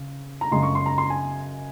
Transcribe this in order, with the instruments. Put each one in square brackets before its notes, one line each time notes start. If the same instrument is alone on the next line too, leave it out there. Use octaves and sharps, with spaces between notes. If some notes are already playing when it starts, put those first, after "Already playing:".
Already playing: [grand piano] C#3
A#5
F#2 C#3 G#3 C6
C#6
C6
A#5
C6
G#5